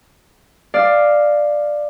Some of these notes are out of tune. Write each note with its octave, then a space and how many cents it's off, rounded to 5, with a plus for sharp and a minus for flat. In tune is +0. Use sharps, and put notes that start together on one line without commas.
D5 +10 F5 +0